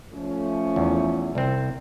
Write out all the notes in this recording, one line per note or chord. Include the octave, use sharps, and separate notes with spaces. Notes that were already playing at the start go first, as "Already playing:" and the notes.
F3 A3 C#4
E2
C2 C4